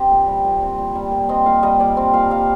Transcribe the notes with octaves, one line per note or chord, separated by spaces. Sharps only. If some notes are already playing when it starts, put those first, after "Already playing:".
Already playing: C4 G4
A#2
G3
A#2
C4
A#2
G3
A#2
C4 D#5
A#2 F5
G3 D#5
A#2 D5
C4
A#2 F5
G3 F5